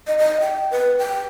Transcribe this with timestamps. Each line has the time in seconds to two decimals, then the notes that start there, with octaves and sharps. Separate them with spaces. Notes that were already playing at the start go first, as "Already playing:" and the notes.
0.07 D#5
0.18 D#5
0.41 G5
0.71 B4
0.99 G5